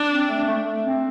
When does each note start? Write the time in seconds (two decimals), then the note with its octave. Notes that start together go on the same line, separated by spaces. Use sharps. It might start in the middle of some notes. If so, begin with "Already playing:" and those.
Already playing: D4
0.10 C4
0.28 A3
0.46 A3
0.64 A3
0.83 C4